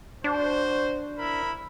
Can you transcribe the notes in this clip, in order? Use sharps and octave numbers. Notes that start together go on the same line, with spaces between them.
D4 F#4 C5
E4 A#4 B5